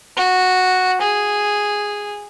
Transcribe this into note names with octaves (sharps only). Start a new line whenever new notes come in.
F#4
G#4